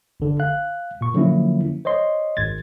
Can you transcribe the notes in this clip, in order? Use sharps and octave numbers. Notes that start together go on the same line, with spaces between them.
G1 D3
F5 F#6
A#2 C#6
D3 F3 F#3 A#3 C#4 E4
C5 C#5 D#5 C6
G#1 G#6 A6